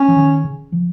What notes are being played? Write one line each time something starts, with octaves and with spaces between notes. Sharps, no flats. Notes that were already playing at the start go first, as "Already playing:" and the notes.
Already playing: C#4
F3
D#3
C#3
F3